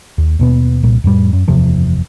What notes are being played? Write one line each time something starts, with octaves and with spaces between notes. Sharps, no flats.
D#2
D#2 B2 B3
C2 A#2
F2 A2 G3
F#2
F#1 E2 C3 F3